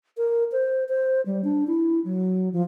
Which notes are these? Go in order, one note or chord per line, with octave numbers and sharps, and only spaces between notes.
A#4
C5
C5
G3
D4
E4
F#3
F3